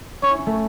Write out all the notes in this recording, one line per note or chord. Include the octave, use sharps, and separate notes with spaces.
C#4 C#5
E4
C#4
A3